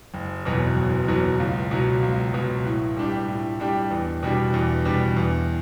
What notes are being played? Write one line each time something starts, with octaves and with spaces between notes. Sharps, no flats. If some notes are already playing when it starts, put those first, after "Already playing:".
F#1
E2 B2 F#3
F#1
E2 B2 F#3
C#2
B2 F#3
C#2
B2 F#3
A2
G3 D4 G4
A2
G3 D4 G4
E2
B2 G3 D4
E2
B2 G3 D4
E2